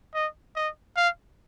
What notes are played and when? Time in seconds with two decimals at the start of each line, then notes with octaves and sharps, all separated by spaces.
0.15 D#5
0.56 D#5
0.96 F5